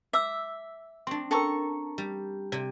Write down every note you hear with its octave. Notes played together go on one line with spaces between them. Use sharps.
E5 D6 E6
C4 D4 C6 C#6
C#4 A4 A#4 A#5 C#6
G3
C3 D5